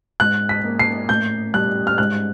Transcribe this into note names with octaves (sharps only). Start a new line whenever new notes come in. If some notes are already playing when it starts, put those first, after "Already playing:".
G#2 F#6
B6
A#3
C7
A2 G6
G3 F#6
F6
G#2 F#6